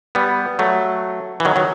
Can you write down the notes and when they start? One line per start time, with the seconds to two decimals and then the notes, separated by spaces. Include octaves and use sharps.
0.15 G3 B3
0.59 F#3 A3
1.40 E3
1.45 D#3 F#3
1.56 D#3 F#3